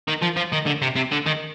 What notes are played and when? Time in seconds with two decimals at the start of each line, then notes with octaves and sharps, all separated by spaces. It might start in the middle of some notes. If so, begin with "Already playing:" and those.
0.08 D#3
0.22 F3
0.37 F3
0.53 D#3
0.66 D3
0.82 C3
0.96 C3
1.12 D3
1.26 D#3